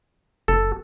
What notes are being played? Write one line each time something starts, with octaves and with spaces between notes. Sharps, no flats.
F#1 A4